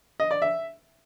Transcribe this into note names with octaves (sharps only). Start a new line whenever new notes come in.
D#5
D5
E5